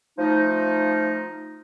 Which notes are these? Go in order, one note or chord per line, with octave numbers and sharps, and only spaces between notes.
F3 A3 D#4